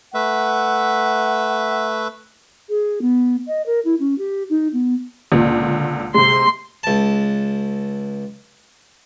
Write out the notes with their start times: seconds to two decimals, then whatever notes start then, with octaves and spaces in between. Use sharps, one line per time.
0.14 A3 B4 E5 F#5
2.69 G#4
3.02 B3
3.47 D#5
3.66 A#4
3.85 E4
4.00 C#4
4.18 G4
4.50 D#4
4.73 B3
5.32 C#2 A#2 D3
6.14 C3 G#3 C6
6.83 C#2 A5